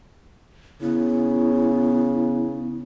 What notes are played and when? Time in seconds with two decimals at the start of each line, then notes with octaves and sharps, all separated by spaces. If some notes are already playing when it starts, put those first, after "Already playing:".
0.81 C#3 B3 E4